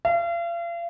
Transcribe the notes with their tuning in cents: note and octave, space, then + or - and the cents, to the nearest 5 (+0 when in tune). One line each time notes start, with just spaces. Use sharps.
F5 -40